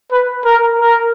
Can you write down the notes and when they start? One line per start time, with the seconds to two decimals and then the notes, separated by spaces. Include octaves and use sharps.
0.12 B4
0.45 A#4
0.80 A#4